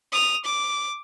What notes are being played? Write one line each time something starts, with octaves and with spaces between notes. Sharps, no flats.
D#6 F7
D6